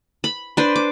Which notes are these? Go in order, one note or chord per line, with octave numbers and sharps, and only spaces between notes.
B5
D4 B4 C5
D6